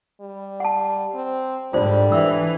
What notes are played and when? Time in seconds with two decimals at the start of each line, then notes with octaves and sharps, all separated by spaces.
0.21 G3
0.60 F#5 A5
1.15 C4
1.73 G#2 D3 G3 F4 C5 D5
2.12 E3 B4 E5 E6